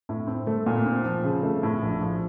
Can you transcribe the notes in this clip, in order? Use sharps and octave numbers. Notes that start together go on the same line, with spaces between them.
A2
C4
A3
A#2
C4
F3
C#3
A3
A2
A#1
F3